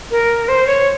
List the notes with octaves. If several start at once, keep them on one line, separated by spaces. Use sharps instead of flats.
A#4
C5
C#5